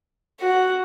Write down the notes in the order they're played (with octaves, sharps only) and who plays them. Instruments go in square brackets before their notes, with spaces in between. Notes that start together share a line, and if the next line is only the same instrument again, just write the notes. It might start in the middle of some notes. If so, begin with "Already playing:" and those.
[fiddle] F#4